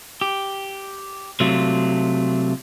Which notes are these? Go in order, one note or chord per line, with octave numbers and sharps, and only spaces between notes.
G4
C3 F#3 A3 F4